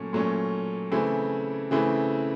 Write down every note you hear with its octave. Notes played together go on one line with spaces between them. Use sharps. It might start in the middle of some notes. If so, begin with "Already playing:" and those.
Already playing: A#2 F#3 A3 C#4
A#2 F#3 A3 C#4
C#3 E3 A3 C4 E4
C#3 E3 A3 C4 E4